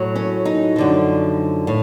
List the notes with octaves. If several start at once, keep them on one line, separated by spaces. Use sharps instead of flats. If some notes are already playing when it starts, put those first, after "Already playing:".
Already playing: A2 F#3
C#4
D#4
F#2 D3 F3
A2